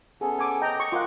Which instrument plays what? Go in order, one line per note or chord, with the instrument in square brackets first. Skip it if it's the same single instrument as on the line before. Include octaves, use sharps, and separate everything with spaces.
[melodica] B3 C#4 A4 [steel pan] G#4
[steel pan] G#5 D6
[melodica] D#5 [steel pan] G5 A#5
[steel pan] C#6
[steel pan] F4 A#4 F#5 [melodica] C6 D6